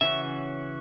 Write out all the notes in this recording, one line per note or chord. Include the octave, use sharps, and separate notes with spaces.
C#3 E3 C#4 F#4 E5